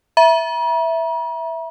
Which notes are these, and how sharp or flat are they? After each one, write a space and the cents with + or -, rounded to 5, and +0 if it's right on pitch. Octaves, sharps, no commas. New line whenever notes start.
E5 +0 A#5 +45